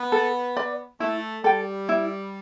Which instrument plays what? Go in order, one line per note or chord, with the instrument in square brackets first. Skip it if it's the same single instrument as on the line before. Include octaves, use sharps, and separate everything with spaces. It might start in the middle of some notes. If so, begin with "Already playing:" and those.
Already playing: [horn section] B3
[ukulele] A4
D5 B5
[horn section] A3 [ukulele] E4
[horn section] G3 [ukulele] A4 G5
[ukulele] E4